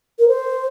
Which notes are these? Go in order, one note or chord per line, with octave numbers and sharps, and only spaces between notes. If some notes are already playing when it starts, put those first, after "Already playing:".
A#4
C5